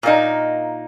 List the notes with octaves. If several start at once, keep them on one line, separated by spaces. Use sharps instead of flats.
A#2 A#3 D#4